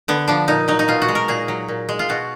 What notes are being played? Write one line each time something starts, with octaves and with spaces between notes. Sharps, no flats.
D3 B3
F3 D4
A#2 D#4
F#3 D#4
D#4
B2 F4
F#4
G#3
A#4
A#2 G#4
F#3
A#2
G#3
F4
B2 F#4